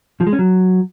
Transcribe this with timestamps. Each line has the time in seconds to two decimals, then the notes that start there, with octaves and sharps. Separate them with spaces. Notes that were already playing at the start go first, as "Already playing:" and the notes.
0.21 F3
0.27 G#3
0.33 C#4
0.39 F#3